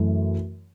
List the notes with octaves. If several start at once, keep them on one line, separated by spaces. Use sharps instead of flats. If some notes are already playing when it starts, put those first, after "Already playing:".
Already playing: F#2 E3 A3